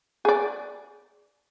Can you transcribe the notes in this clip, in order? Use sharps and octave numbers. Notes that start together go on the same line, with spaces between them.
G#4 D5